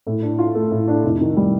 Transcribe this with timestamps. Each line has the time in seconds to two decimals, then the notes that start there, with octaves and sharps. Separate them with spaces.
0.07 A2
0.22 D4
0.38 F4
0.55 A3
0.71 A2
0.88 D4
1.04 F1
1.20 D#3
1.37 G3